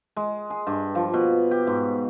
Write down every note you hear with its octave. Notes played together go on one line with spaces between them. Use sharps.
G#3
G#4
G2
F3
B2
G4
G#2